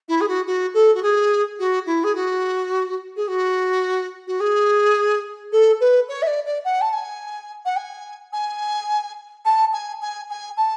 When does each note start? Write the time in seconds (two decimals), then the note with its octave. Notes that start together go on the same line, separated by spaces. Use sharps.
0.08 E4
0.20 G#4
0.28 F#4
0.47 F#4
0.74 A4
0.94 F#4
1.02 G#4
1.59 F#4
1.86 E4
2.03 G#4
2.15 F#4
3.16 G#4
3.28 F#4
4.27 F#4
4.40 G#4
5.52 A4
5.80 B4
6.08 C#5
6.22 E5
6.27 D5
6.45 D5
6.64 F#5
6.81 A5
6.93 G#5
7.65 F#5
7.76 G#5
8.32 G#5
9.45 A5
9.73 G#5
10.01 G#5
10.30 G#5
10.57 A5